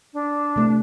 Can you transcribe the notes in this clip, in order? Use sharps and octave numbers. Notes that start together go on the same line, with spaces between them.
D4
C3 A3